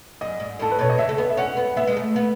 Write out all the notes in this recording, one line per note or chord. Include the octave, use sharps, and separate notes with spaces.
F#2 D#5
G#2
A2 A4
B4
B2 C#5
D#5
C#3 E5
A3
B3
E5
C#4 F#5
B3
B3 E5
G#3
A3
B3